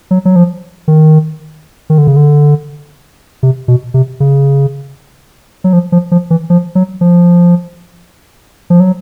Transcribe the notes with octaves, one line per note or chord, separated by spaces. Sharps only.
F#3
F#3
F3
D#3
D#3
D3
C#3
D3
C3
B2
C3
C#3
F#3
F3
F3
F3
E3
F3
F#3
F3
F3
F#3